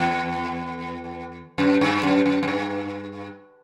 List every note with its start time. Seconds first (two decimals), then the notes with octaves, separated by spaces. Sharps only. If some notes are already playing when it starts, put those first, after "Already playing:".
Already playing: E2
1.58 F#2
1.81 G2
2.03 F#2
2.26 F#2
2.43 F#2
2.48 G2